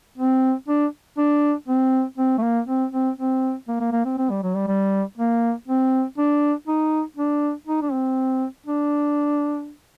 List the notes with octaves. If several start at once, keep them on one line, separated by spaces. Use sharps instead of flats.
C4
D4
D4
C4
C4
A3
A#3
C4
C4
C4
A#3
A#3
A#3
C4
C4
G3
F#3
G3
G3
A#3
C4
D4
D#4
D4
D#4
D4
C4
D4